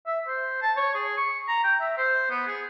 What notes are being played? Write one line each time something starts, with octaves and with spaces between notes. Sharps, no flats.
E5
C5
A5
C#5
G#4
C#6
A#5
G5
E5
C5
B3
G#4